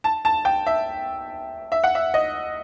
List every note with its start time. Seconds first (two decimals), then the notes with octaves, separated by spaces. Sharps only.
0.04 A5
0.25 A5
0.45 G5
0.66 E5
1.72 E5
1.84 F#5
1.95 E5
2.14 D#5